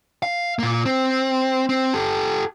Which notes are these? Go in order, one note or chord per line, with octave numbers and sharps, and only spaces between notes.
F5
A#2 A#3
C4
C4
G4 A4